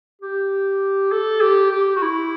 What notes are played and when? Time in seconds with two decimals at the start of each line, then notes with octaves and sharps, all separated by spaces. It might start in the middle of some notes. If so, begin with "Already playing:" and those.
0.22 G4
1.12 A4
1.41 G4
1.71 G4
1.96 F#4
2.02 E4